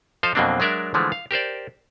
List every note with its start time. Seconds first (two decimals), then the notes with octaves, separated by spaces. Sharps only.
0.23 F3 A4 C5 D#5 F5
0.35 F2 B2 F#3 A#3 C4 D4
0.60 F#3 G#3 D4 A#4 D5 E5
0.94 D3 E3 F3 G#3 A3
1.12 F5
1.31 G4 A#4 C5 D5